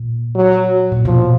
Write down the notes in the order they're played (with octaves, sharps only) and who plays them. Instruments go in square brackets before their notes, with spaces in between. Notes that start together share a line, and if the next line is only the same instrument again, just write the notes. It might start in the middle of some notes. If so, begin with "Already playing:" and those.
Already playing: [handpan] A#2
[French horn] F#3
[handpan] A#2
[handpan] B2 [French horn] F3